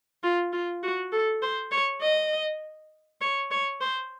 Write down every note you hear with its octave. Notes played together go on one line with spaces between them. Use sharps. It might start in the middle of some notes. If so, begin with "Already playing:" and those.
F4
F4
F#4
A4
C5
C#5
D#5
C#5
C#5
C5